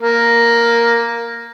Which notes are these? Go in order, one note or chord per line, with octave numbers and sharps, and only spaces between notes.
A#3